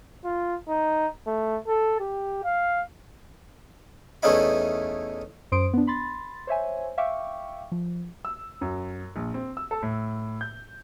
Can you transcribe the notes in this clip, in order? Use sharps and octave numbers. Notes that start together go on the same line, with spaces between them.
F4
D#4
A3
A4
G4
F5
E2 A3 C#4 D#4 E4 B5
F#2 C5 C6 D#6 D7
B3 D4
B5 C6 A6
C5 C#5 E5 G#5
E5 F5 G5 C#6 D6
F3
E6
F#2
A#1
C4
E6
A4
A2
G6